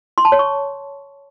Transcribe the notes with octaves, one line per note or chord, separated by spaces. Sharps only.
C6
A5
C#5
C#6